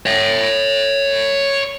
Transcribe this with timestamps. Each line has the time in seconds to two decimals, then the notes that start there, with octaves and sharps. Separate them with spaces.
0.06 C#5 E5